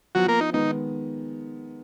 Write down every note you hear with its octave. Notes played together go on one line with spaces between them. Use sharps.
F3 F#3 B3 F4 F#4 B4
A#3 A#4
D#4
D#3 G#3 B3 D#4